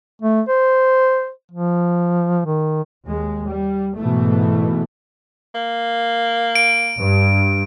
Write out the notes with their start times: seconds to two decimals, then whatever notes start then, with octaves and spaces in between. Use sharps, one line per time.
0.22 A3
0.48 C5
1.52 F3
2.45 D#3
3.05 D#2 G#3
3.46 G3
3.96 G#2 B2 E3 A3
5.55 A#3
6.55 D7
6.99 G2